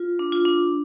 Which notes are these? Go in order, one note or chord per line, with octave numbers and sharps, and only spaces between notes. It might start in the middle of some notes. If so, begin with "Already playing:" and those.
Already playing: F4
D4
F4
D4